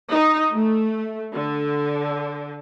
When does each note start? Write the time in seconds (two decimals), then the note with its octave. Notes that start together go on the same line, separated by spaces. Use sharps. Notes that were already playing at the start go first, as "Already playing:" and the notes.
0.11 D#4
0.53 A3
1.34 D3